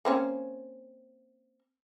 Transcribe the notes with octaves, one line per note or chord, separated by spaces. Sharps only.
A#3 C4 C#4